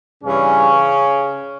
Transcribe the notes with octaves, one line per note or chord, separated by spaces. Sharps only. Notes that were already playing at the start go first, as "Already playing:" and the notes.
G2 C#3 E3 C#4